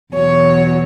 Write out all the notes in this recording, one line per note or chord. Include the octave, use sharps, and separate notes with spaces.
E2 B2 F#3 C#5